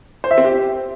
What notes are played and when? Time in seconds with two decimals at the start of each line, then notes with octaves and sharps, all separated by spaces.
0.24 C5
0.31 E5
0.38 C4
0.44 G4